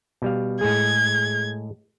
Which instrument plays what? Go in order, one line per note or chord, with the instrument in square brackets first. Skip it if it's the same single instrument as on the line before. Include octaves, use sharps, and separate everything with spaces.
[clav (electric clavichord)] B2 G3 F5
[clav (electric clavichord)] A2 G#3 G#4 [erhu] G#6